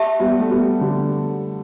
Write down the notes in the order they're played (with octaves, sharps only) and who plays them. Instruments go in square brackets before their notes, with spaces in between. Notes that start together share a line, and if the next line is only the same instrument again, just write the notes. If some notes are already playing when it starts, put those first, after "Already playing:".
Already playing: [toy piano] G4 E5 A5
[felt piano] G3 B3
A3
G3 B3
D3 G3